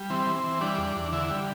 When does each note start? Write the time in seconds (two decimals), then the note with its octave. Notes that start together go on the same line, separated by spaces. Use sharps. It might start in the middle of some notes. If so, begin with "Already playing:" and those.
Already playing: G3
0.10 E3 C4
0.27 E3
0.36 C4
0.44 E3
0.61 G3 D4
0.78 E2
0.96 E2
1.12 D3 E4
1.31 G3